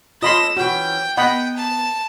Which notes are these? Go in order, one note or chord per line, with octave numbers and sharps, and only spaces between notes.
C#4 F4 A4 D#5 B5 C6 A#6 E7
E3 C#4 F#4 G5
B3 D#5 F#5 G5 B5
A5